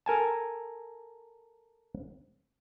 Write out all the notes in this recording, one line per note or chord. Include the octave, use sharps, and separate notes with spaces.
A4 A#4 G#5 A5